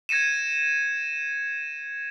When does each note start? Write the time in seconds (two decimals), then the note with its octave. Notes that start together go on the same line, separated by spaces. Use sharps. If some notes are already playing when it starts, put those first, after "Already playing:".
0.09 G#6 A#6 C#7 D#7 E7